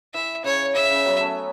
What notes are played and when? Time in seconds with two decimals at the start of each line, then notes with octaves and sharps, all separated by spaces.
0.14 E3 E5
0.44 C#3 C#5
0.75 C#3 E5
0.90 C#3
1.06 F#3 B3
1.21 A3 C#4